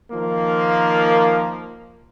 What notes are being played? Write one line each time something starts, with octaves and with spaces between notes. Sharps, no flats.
D#3 F3 A#3